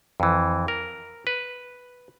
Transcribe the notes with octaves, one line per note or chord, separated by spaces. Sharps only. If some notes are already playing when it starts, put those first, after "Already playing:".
F2 E3
A#4
B4